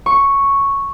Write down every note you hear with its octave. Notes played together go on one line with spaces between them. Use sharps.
C#6